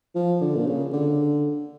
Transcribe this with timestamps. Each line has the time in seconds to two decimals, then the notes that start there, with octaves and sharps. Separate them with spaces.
0.15 F3
0.41 D3
0.56 A#2
0.67 C#3
0.93 D3